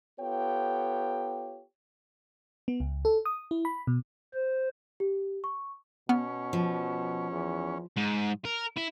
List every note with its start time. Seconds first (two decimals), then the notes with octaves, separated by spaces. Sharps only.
0.21 B3 F4 G4 A4 C#5 G5
2.68 B3
2.80 C#2
3.05 A4
3.26 D#6
3.51 E4
3.65 B5
3.87 B2
4.34 C5
5.00 G4
5.44 C#6
6.09 B2 B3 C#4 F6
6.53 F3
7.31 E2
7.97 G#2
8.45 A#4
8.77 E4